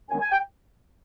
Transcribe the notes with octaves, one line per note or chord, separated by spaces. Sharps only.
F#2 D#3 G#3 B3 D4 G#5
G#5
G5